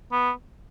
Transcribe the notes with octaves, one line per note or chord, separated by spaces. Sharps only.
B3